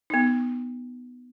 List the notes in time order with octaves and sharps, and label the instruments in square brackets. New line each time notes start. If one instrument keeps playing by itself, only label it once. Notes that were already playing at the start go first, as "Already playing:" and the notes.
[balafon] B3 D#4